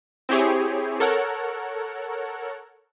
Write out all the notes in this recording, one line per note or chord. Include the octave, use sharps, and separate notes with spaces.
C4 E4 G4 G#4 C#5
A4 A#4 C#5 F#5